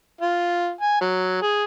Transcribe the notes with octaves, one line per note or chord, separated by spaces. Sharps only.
F4
G#5
F#3
G#4